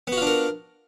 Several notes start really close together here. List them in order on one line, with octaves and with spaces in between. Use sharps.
B3 F#4 F4 D4 A#4